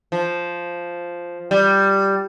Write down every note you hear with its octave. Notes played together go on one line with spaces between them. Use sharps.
F3
G3